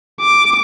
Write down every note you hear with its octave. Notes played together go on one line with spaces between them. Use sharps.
D6